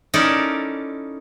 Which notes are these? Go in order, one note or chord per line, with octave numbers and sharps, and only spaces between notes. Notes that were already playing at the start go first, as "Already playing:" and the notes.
C#4 D#4 E4 A4 A#4 D5